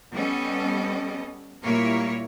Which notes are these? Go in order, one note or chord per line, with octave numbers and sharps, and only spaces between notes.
G3 B3 C#4 A4 D#5
A#2 G3 A#3 E4 A#4 C#5